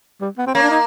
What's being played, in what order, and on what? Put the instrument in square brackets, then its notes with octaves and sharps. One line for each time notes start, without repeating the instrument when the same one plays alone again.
[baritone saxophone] G3
B3
C4
[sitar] A#3 [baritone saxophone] C#4
[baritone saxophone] D4
D#4